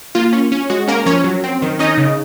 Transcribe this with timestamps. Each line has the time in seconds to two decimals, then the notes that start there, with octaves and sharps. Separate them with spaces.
0.15 A#3 F4
0.33 C#4
0.52 C#4
0.70 G#3 F#4
0.88 A#3 C#4 A#4
1.06 F3 C#4 C#5
1.24 F#3
1.44 C4
1.62 D#3
1.79 C#4 D#4 D#5
1.98 C#3